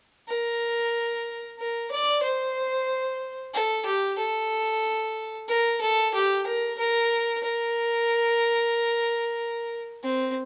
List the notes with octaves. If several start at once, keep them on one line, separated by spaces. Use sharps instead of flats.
A#4
A#4
D5
C5
A4
G4
A4
A#4
A4
G4
A#4
A#4
A#4
C4